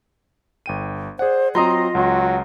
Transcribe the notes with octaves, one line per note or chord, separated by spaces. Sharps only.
G1 G5 D#7
G#4 C5 D5 F#5
F#3 C4 F4 D#5 A#5 C6
C#2 F#3